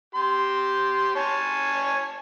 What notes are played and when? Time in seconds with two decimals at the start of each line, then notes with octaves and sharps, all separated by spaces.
0.15 G4 C6
1.16 C#5 G#5 A5